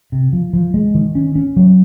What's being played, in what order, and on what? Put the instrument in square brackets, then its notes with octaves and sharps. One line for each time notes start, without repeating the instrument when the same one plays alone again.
[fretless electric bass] C3
F3
F3
G#3
D#3
C#4
C#4
F#3